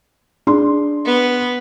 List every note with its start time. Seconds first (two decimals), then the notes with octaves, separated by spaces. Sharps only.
0.47 D4 G#4 C6
1.06 B3